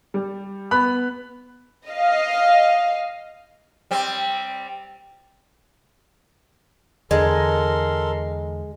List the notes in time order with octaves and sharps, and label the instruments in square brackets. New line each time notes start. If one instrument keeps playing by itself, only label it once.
[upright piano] G3
B3 B5 F#6
[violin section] D#5 F5
[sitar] G3 C4
[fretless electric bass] E2 D3 [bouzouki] G#3 [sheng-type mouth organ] A4 A#4 C6